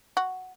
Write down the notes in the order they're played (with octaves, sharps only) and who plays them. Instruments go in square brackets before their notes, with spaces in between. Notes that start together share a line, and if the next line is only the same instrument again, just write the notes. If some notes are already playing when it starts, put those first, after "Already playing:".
[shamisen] F#4